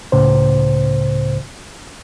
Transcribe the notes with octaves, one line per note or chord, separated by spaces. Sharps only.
C#2 A2 C#3 C5